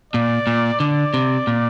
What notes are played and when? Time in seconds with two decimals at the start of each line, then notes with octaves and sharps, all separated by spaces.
0.14 A#2 D5
0.47 A#2
0.80 D3 D5
1.14 C3
1.47 A#2